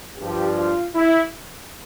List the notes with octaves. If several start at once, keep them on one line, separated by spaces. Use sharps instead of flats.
G2 F3 G4
F4
E4